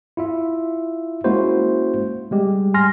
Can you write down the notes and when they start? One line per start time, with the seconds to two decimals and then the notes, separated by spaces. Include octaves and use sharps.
0.17 E4 F4 E5
1.24 G#3 A#3 C#4 E4 F#4 C5
2.31 G3 G#3 G4
2.74 G#5 C6 F6 A#6